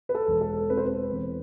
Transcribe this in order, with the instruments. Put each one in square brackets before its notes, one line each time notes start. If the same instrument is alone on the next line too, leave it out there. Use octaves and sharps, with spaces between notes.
[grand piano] B4
A4
E1
A4
C4 B4
C5
B4
E2